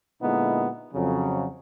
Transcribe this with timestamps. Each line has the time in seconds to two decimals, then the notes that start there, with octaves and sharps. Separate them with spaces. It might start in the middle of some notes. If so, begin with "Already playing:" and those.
0.22 A#2 D3 G#3 B3 D#4 E4
0.94 F2 C#3 F#3